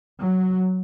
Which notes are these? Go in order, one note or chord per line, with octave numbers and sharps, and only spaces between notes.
F#3